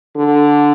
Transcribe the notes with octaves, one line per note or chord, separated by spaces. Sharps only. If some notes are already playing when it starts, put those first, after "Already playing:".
D3